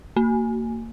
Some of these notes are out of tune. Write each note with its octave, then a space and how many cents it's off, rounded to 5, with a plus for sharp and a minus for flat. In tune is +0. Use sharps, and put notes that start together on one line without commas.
A#3 -30